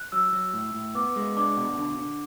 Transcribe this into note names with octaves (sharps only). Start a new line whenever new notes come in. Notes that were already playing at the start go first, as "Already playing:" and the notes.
Already playing: F#6
F#3 E6
F#3
A2
A2
B3 D6
G#3
D4 D6
B2
D3
D3